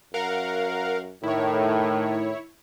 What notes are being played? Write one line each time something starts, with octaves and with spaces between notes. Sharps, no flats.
F#2 A#4 F5 F#5
A2 D#3 E4 C#5